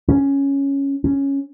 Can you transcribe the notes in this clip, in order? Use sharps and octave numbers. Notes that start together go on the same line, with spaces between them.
C#4
C#4